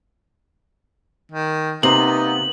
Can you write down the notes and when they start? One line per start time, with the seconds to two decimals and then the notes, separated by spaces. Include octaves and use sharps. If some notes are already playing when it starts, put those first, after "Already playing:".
1.32 D#3
1.83 C3 A#3 B3 D#4 F#7